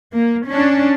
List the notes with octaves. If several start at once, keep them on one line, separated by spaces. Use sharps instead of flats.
A#3
C#4 D4